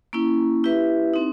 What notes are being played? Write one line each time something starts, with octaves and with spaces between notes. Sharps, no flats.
A#3 C#4 E4
E4 G4 B4 E5
C4 D#4